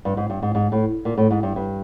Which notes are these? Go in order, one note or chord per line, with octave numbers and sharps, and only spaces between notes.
G2
G#2
G2
G#2
G#2
A2
A#2
A2
G#2
G2
G2